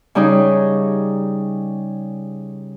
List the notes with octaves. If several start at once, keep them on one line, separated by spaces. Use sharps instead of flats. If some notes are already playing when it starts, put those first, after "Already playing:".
C#3 G3 D#4 G#4